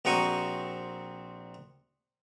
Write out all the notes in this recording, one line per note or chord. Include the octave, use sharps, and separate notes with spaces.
A#1 C4 F#4 A#5 C#6 D#6